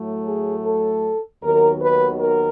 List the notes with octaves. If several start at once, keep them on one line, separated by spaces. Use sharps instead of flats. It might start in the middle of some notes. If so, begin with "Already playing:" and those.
Already playing: A2 F#3 A3
G#4
A4
D#2 D#3 F#3 B3 A#4
B4
A#4